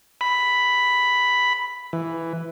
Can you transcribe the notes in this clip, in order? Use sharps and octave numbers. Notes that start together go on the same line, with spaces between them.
B5
E3